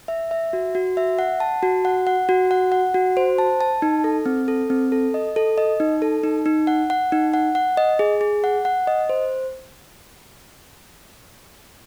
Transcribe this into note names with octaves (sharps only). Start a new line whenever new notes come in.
E5
E5
F#4
F#4
E5
F#5
A5
F#4
F#5
F#5
F#4
F#5
F#5
F#4
C5
A5
A5
D#4
A4
C4
A4
C4
A4
D#5
A4
D#5
D#4
A4
D#4
D#4
F#5
F#5
D#4
F#5
F#5
D#5
G#4
G#4
F#5
F#5
D#5
C5